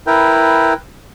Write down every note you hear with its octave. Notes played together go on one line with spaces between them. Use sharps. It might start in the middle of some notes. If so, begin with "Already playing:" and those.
E4 A#4 B4 G5